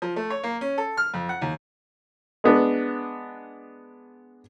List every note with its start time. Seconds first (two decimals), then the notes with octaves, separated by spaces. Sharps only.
0.02 F3
0.16 A3
0.30 C#5
0.43 A#3
0.61 C#4
0.78 A4
0.97 F6
1.14 F2
1.29 F#5
1.42 D#2
2.44 G#3 B3 D4